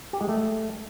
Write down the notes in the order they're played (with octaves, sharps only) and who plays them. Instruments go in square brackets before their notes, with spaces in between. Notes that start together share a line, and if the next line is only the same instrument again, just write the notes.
[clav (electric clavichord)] G4
G#3
A3